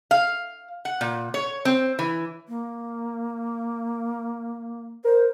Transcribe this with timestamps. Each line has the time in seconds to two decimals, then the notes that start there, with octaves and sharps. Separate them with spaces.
0.11 F5
0.85 F#5
1.01 A#2
1.34 C#5
1.65 C4
1.99 E3
2.48 A#3
5.04 A#4 C5